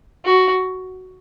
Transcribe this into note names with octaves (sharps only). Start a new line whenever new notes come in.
F#4